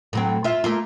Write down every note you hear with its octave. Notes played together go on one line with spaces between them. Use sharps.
A2 F#3 C4
F4 E5
A3 A#3 F4